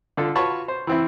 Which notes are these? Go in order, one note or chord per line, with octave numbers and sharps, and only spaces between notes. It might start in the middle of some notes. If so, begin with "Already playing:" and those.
D3 F4 A4
F4 F#4 B4 C#5 A5 C#6
C5
E3 C4 E4